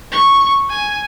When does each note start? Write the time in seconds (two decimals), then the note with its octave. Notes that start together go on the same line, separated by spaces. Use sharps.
0.12 C#6
0.70 G#5